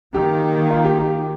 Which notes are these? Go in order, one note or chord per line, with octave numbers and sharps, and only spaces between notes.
D#3 A#3 G4
F4
G4
G4